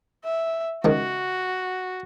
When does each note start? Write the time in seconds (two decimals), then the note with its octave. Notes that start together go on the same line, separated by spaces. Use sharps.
0.25 E5
0.85 C#2 D#3 F#4